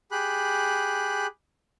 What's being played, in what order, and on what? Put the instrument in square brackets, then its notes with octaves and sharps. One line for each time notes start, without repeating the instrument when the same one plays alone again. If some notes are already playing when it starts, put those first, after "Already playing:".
[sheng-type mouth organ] G4 G#4 B5 F#6